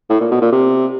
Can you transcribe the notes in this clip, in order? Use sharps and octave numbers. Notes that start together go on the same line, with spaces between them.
A2
A#2
B2
A#2
C3